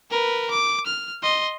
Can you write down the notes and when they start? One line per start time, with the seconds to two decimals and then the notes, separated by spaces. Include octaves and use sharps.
0.11 A#4 B4
0.51 D6
0.86 F6
1.23 D#5 C6